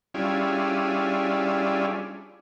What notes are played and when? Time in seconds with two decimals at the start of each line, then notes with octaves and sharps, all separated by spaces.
0.14 G3 C#4 D4 E4 F4 G#4